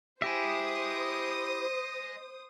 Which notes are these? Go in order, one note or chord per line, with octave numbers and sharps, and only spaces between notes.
E4 G4 C5 D#5 E5 G#5 D#6